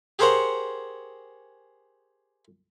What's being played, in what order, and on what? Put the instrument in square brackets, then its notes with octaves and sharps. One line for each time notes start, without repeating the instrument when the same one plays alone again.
[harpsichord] G4 G#4 A#4 C5 C#5 F#5